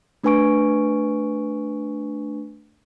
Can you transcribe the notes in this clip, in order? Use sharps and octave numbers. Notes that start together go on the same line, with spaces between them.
A3 D4 B4 G#5 C#6 D7